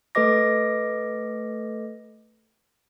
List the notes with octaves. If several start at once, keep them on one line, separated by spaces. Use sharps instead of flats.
A3 A4 B4 D#5 D6 A#6